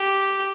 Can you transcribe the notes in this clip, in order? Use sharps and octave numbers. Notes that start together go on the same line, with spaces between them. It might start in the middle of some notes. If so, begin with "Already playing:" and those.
Already playing: G4